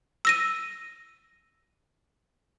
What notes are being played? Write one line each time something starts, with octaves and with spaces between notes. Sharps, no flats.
E6 A#6 D#7